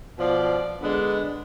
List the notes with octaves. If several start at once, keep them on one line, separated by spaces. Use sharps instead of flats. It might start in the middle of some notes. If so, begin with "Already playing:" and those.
B2 F3 D5
D3 G#3 B3 D4